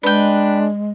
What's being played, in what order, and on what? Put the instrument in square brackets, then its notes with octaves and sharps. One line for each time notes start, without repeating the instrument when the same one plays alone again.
[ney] G#3 [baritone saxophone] D4 [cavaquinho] B4 G5